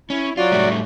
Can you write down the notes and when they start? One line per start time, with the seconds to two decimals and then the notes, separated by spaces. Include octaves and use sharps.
0.10 C#4 E4
0.37 F#3 F4 F#4 D5
0.52 A2 G3 A3